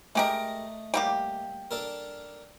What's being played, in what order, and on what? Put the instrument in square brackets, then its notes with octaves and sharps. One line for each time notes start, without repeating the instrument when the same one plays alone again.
[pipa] G#3 G4 A#4 [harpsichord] A3 D#5
[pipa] G3 A#3 G4
[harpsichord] D4 A4 A#4